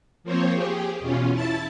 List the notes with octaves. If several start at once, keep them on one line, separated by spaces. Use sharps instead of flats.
F3 A#3 C4 C5 C#5
G4 G#4
E2 B2 C#4 F4
E4 A5 A6